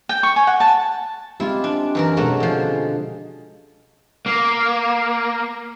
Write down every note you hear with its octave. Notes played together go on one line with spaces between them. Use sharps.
G5
C#6
G#5
F#5
A5
G#3 C4 E4 F4 G4
D4
F#2 E3 A#4
B2 G#3 A3 C#4 F#4 G#4
D3 F3
A#3